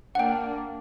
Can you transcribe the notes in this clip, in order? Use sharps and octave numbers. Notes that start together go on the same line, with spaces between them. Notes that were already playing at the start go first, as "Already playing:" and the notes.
A#3 D4 F#5 G5